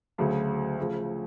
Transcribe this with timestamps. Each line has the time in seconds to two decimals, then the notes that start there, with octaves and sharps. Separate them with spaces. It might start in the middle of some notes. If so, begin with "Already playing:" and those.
0.18 D2 C#3 F#3 A3
0.78 C#3 F3 A3